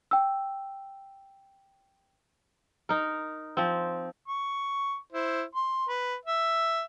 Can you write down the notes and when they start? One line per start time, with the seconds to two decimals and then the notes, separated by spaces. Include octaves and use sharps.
0.11 G5 E6
2.89 D#4 A#4
3.57 F3 C4
4.28 C#6
5.12 E4 C5
5.55 C6
5.89 B4
6.25 E5